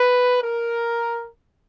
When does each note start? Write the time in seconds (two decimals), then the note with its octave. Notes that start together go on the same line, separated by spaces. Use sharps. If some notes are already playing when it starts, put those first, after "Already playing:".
Already playing: B4
0.42 A#4